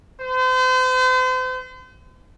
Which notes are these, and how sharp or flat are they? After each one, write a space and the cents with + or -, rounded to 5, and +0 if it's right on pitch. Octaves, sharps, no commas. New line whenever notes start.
C5 -40